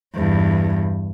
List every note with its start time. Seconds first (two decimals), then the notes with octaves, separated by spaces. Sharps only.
0.14 E2 G2